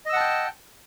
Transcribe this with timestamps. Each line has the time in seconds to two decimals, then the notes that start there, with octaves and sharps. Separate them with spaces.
0.06 D#5
0.09 E6
0.13 F#5
0.16 A5
0.20 G5